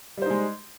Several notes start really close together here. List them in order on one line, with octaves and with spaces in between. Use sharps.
G3 C5 D#4 G#3